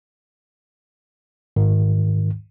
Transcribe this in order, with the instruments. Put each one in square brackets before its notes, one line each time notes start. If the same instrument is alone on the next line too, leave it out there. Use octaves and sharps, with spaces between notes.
[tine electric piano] G#2 D#3